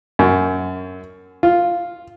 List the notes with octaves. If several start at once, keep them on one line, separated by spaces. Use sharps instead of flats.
F#2
F4